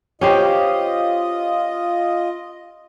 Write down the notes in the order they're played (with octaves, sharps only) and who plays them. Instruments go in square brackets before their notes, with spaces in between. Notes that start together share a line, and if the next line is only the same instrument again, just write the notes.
[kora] C#4 G4 C5 [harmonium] F4 D#5